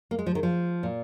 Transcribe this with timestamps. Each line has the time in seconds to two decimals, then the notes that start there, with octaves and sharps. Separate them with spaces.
0.11 A#3
0.19 G#3
0.26 F3
0.35 D#3
0.43 F3
0.83 A#2